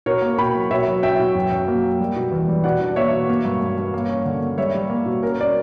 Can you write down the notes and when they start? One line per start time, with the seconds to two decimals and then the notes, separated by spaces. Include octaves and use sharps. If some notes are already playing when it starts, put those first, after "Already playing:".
0.06 B2 A#4 C#5
0.22 A#3
0.38 B2 G5 B5
0.55 F#3
0.71 B2 C#5 E5
0.88 F#3
1.03 C#4 E5 G5
1.19 B2
1.35 F#2
1.51 F#2
1.68 A#3
1.83 F#3
2.00 G3
2.16 B2
2.32 E2
2.48 G3
2.64 B2 D5 F#5
2.81 D4
2.96 A#3 C#5 E5
3.12 B2
3.29 A#3
3.45 G2
3.61 G2
3.78 G2
3.94 A#3
4.09 C#4
4.25 D3
4.42 A#3
4.58 G3 C#5 E5
4.74 G3
4.90 A#3
5.06 B2
5.22 C#4 A#4
5.39 C#4 D5